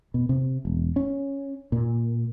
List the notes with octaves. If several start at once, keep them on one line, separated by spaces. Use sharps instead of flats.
B2
C3
E1
C#4
A#2